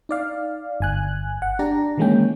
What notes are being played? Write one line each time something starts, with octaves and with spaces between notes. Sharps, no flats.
D#4 D5 F5
G1 G#5 F#6
F#5
D4 G4 D5 A#5
D#3 E3 G#3 A#3 C#4 G5